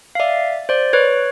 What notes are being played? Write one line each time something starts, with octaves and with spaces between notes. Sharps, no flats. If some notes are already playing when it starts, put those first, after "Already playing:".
F5
D5 E5
C5 D5
B4 C#5